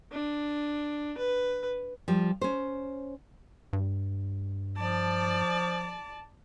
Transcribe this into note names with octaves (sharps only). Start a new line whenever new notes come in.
D4
B4
F3 G3
C#4 C5
G2
F3 D5 A5